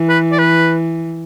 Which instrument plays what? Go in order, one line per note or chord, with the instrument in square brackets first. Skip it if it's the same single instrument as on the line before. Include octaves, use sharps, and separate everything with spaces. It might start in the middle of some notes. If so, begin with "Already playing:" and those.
Already playing: [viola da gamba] E3
[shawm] B4
D5
B4